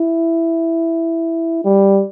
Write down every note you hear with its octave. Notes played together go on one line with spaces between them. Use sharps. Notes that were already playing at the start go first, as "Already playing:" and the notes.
Already playing: E4
G3